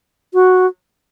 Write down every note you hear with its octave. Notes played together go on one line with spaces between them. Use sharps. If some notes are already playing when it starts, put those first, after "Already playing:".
F#4